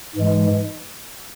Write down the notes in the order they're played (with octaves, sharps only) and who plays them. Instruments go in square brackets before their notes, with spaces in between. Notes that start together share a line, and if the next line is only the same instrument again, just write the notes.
[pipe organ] G#2 E3 G#3